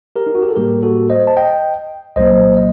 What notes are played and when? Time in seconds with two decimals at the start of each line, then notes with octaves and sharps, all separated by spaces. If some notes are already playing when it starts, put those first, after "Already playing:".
0.16 G4 A#4
0.27 D#4
0.35 F#4
0.42 G4
0.49 A4
0.56 A2 G3 A#3 G4 A#4
0.83 F#4 A4
1.10 C5 D#5
1.27 A5
1.37 D#5 G5
2.16 C2 A#2 F#3 A#3 C5 D#5
2.57 D#5